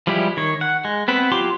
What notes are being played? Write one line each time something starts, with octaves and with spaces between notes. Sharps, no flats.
F3 G3 G#3 E4 G4
D#3 C#5
F#5
G#3
B3 C4 B4
F#3 F4 G4 C6 D6